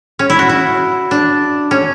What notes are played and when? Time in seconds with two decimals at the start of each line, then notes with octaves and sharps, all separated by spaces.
0.19 C#4
0.30 E4
0.39 F#4
0.49 E4
1.11 D4
1.71 C#4